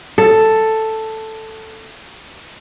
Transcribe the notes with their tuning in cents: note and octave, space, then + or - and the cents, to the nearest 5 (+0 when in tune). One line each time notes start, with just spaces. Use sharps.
A4 +5